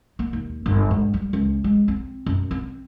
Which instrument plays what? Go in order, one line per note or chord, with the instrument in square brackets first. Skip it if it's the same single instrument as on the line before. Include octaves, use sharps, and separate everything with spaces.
[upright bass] A#3
D#2
G1
G#2
G3
C#2
G#3
C4
F#2
C4